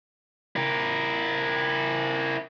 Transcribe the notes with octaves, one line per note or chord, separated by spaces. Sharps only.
E4 A#4